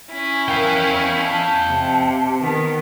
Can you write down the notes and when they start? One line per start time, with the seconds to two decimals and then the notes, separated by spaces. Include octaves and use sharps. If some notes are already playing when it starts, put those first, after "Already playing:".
0.12 C#4 E4 G#5
0.49 A#4 F5 G5
1.26 A5
1.70 C3
2.41 D#3 B3